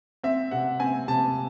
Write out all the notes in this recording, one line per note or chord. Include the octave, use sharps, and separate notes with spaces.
C4 E5
C3 F#5
C4 G#5
C3 A5